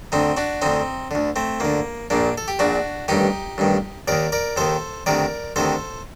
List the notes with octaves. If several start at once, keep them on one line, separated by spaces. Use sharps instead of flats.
D2 D3 C4 D#4
D4 F#4
D2 D3 C4 D#4
D2 D3
A3 C4
D2 D3 A#3
A#1 A#2 A#3 D4
A4
G4
A#1 A#2 D4 F#4
A1 G2 D#3 D#4 G4
A1 G2 D#3
D#2 D#3 A#4 D5
A#4 D5
D#2 D#3 A4 C5
D2 C3 D#3 A#4 D5
D2 C3 D#3 A4 C5